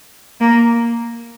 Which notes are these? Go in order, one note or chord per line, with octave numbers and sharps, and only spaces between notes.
A#3